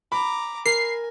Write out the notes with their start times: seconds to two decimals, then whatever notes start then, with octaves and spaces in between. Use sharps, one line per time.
0.12 A#5 B5 D6
0.66 A#4 G#5 C7